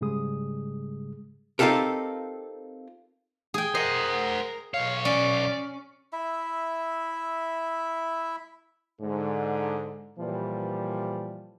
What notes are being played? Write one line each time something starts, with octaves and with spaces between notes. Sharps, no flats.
G#2 C#3 G3 G#3 G#4 D#6
C4 D#4 F4 G4 A4 A#4
G#4 G5
A#4 C5 D#5 F#5
B1 C#5 F5
C#4 D5
E4 E5
G#2 D3
A#2 E3 F3 G3